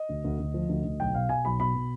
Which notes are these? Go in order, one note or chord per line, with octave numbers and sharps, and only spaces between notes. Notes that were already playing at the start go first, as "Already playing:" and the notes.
Already playing: D#5
D2
D2
D2
F3
D2
D2
B1 G5
B2 F5
B2 G#5
B1 B5
B2 B5
B2